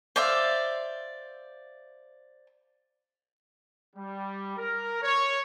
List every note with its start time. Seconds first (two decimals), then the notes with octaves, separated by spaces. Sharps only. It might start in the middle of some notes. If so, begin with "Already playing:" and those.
0.16 C5 D5 E5 F5
3.95 G3
4.57 A#4
5.02 C#5